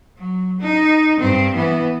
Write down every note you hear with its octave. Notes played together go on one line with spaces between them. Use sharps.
F#3
D#4
G2 C4
E3 B3